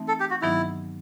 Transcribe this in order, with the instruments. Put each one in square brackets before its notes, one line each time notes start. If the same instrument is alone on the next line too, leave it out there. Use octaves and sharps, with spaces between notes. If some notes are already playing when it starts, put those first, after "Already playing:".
Already playing: [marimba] E3 A3 C4 D#4
[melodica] A4
G4
F#4
[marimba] G2 D#3 F#3 B3 D#4 [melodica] E4